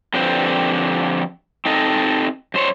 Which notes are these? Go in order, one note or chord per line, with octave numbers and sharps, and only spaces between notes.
D3 F3 C4 G4 B4 C5
C4 D#4 A4 D#5
F#2 C5 C#5